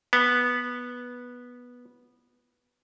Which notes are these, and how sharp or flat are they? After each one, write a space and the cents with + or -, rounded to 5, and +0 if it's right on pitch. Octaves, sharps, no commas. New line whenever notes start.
B3 -10